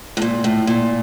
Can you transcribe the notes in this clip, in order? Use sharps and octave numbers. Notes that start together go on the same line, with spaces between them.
A2
A#2
A2
A#2